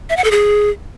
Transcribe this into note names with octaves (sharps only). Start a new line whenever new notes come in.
E5
F#5
A4
G#4